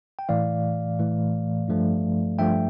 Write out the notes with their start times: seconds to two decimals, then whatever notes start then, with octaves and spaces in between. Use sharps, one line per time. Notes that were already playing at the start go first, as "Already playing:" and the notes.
0.19 G5
0.29 A2 E3 A3 D5 F5
0.99 A2 E3 A3
1.68 G2 F3 A3
2.39 G2 F3 A3 E5 G5